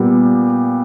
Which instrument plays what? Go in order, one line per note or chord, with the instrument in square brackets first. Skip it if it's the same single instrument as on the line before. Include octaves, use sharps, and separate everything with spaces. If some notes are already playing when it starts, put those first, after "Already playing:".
Already playing: [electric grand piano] A#2 G3 B3